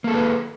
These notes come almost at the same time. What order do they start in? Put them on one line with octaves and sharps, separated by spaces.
A#3 A4 G#4 B4